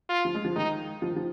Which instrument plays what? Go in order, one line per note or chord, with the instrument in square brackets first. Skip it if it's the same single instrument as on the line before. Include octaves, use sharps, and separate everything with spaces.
[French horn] F4
[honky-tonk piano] F3
G#3
F3
[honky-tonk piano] D#3 G#3 [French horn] D#4
[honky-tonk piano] F3
D#3
F3